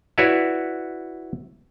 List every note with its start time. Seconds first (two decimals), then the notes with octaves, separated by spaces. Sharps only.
0.18 E4 F#4 B4 C#5 D5 E5